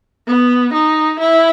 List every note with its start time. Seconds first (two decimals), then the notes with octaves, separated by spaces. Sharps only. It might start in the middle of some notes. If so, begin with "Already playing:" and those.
0.27 B3
0.73 D#4
1.19 E4